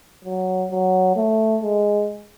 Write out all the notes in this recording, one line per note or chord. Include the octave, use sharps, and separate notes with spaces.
F#3
F#3
A3
G#3